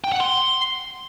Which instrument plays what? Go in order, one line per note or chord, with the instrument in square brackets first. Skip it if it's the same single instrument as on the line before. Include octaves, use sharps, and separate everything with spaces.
[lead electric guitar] G5
F#5
C6